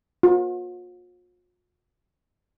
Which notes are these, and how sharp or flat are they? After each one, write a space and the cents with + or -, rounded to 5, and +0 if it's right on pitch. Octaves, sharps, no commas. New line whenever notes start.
F4 +40